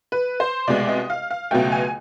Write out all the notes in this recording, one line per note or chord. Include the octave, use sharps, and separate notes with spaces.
B4
C5
C2 B2 G#3 D5
D#5
F5
F5
C#2 B2 F#3 A3 G5
G#5